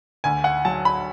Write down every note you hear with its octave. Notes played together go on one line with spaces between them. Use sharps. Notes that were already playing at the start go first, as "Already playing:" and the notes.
D2 G#5
F#5
F#3 A5
B5